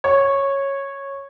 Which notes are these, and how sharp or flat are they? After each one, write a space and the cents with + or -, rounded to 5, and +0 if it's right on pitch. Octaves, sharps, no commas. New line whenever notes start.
C#5 -10